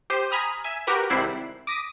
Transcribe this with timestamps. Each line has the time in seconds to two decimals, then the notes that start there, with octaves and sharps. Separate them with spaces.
0.10 G4 C5 D#7
0.31 G#5 A#5 B5 D#6 F6
0.64 E5 G#5
0.87 F#4 G4 A#4 B4
1.09 G#1 C3 G3 E4 F#6 C7
1.67 D6 D#6 A#6 B6 D#7